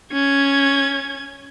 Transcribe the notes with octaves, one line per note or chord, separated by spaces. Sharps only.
C#4 G#6